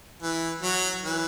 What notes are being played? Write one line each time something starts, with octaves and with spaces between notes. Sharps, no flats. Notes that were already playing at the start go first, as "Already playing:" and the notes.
E3
F#3
E3